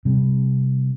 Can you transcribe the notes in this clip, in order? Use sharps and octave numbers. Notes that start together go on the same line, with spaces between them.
C3 G3